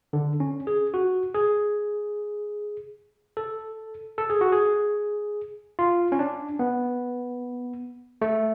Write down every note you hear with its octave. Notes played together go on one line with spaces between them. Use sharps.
D3
C#4
G#4
F#4
G#4
A4
A4
G#4
F#4
G#4
F4
C#4
D4
B3
A3